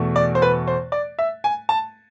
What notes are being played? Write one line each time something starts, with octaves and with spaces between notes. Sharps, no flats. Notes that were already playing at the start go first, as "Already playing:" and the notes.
Already playing: E2 B2 A3
D5
C5
B4
C5
D5
E5
G#5
A5